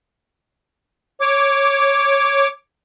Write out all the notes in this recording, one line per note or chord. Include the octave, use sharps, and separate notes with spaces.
C#5 D6